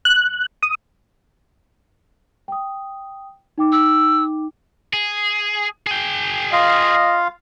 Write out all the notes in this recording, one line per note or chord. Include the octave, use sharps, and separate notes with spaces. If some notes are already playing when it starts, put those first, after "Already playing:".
F#6
D#6
G5 D#6
D#4 G5 D6
E6
G#4
G#4 G5
F4 D#5 F5